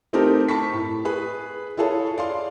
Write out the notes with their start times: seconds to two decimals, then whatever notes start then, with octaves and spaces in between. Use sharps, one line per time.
0.13 A3 C4 D#4 G4 A4 A#4
0.48 A5 B5 C#6 B6
0.73 A2
1.05 G#4 B4 B5
1.77 E4 F4 G#4 A4 C#5
2.18 D5 F5 C6